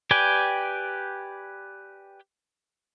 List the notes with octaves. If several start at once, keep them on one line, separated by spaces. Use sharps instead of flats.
G4 B4 D5 G5 G#5